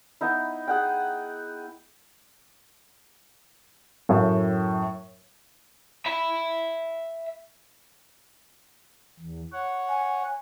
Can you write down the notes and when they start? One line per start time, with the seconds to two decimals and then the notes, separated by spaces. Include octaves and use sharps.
0.21 B3 D#4 E4
0.68 G#4 F#5 G5
4.09 F#2 A2
6.06 E5 B5
9.19 E2
9.53 C#5 F#5
9.89 G#5